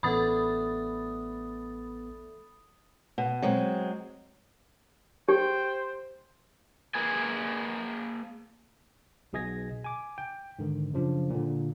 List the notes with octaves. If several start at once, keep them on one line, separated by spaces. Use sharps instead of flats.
A1 A3 B3 D4 D5 B5 D#6 A6
B2
F#3 G#3 C4
G4 C5 G5
A#3 G#4 B4 G#5
B1 B2 G#4 D#5 G#6 A#6
G#5 D6
G5
G#2 D3 D#3
F#2 C#3 F3 D4
A#2 D3